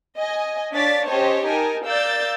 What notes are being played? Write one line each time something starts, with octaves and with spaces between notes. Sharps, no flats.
D#5 G#5
D4 C#5 D5 F5 A6 B6
C#4 G4 C5 C#5 D#5 A5
D#4 A#4 D#5 G#5 A5
A#4 D5 F5 E6 G6 A6